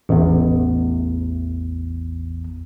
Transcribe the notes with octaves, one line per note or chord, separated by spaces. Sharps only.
A1 E2